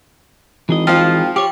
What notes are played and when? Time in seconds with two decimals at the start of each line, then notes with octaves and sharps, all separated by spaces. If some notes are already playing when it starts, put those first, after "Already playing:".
0.69 G#1 E3 G#4 D#5
0.87 F3 F4 F5 G5
1.36 G4 C#5 G5 D6